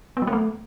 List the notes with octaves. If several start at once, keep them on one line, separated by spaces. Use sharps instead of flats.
B3
F#3
A#3
A3